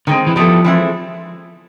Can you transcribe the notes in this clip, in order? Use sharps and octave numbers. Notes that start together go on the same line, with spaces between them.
D3 D#3 G#3 C4
E3
F3 G3 B3 E4 A4
E3 G#3 C4 E4 A4